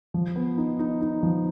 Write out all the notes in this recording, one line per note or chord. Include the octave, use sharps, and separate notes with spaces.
F3
B3
D#4
D#4
D#4
F3